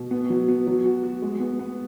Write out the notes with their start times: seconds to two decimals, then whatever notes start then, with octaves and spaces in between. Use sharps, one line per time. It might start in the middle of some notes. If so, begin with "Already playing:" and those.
Already playing: B2
0.11 B3
0.30 F#3
0.48 B3
0.67 F#3
0.86 F#4
1.03 F#4
1.22 G#3
1.40 B3
1.59 B3